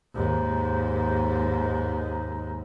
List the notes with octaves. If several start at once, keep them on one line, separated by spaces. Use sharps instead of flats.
D#2 G#2